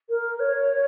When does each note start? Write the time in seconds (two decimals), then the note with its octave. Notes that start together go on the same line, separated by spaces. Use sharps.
0.09 A#4
0.40 C#5